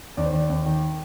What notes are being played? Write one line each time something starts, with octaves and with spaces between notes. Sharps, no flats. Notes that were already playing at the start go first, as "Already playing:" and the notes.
D#2 D5
C5
D#3 D5
D#2
D#3